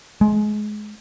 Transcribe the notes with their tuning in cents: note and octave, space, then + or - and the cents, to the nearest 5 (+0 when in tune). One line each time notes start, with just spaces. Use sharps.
G#3 +25